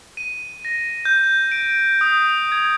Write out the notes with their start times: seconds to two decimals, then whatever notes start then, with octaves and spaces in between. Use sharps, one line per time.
0.17 D#7
0.65 A#6
1.05 G6
1.52 D7
2.01 D#6
2.52 G#6